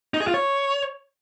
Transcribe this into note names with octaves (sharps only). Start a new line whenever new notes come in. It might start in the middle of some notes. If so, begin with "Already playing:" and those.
D#4
G#4
F4
C#5